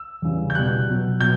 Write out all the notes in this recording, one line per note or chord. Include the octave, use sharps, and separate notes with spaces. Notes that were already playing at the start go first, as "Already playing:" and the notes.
Already playing: E6
E2 C#3 E3 G3
G6
B2 G3 F#6
B2 F#3
B2 F#3 G6